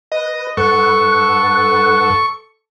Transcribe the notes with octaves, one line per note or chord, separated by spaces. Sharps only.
B4 D#5
G2 A4 B4 F#5 C#6